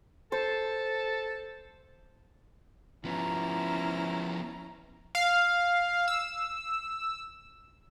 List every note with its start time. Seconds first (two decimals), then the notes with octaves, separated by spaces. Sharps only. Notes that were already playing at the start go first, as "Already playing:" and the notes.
0.32 A4 C5
3.04 F3 B3 C#4 E4 A#5
5.15 F5
6.08 E6